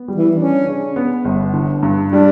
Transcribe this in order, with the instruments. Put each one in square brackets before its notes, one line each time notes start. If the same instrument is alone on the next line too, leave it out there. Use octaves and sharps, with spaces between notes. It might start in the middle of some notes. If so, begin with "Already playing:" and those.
Already playing: [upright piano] B3
G3
[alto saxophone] E3
[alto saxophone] C#4 [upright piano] D4
[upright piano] C#3
B3
G1
D3
G2
[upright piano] G3 [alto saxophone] D4